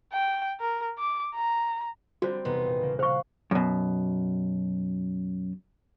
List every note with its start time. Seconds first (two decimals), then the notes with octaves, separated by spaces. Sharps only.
0.13 G5
0.60 A#4
0.99 D6
1.35 A#5
2.22 D3 G3 C4 F#4 C5 A#5
2.45 E1 C3 B3 D#4 C6
2.66 A#2
2.81 C#3 A#3
2.99 C5 F5 F#5 C#6 F6
3.51 F#2 B2